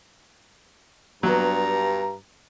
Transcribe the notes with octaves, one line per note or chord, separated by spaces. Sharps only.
G2 F#3 B3 A#5